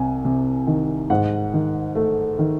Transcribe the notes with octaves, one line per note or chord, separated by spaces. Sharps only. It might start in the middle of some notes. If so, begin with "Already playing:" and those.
Already playing: C2 C3 G#5
C3
D#3
G#2 F#5
D#3
A3
D#3